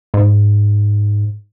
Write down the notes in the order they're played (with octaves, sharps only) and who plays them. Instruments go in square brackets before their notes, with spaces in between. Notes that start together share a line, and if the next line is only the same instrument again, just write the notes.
[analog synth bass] G#2